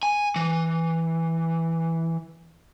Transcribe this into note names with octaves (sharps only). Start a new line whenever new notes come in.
G#5
E3